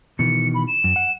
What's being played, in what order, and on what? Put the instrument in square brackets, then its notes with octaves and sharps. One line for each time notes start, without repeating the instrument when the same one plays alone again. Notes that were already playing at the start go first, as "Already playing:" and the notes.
[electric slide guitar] B2 D#3 E3 [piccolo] C#7
[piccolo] B5
E7
[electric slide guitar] F#2
F#5